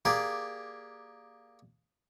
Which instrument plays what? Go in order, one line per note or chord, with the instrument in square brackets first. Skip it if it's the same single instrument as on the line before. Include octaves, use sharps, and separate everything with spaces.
[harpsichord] A#3 G4 G#4 D5